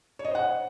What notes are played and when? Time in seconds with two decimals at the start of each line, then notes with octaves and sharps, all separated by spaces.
0.19 C#5
0.24 D#5
0.30 C5
0.35 F#5